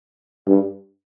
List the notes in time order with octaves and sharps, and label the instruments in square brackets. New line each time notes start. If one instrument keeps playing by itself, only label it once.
[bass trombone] G2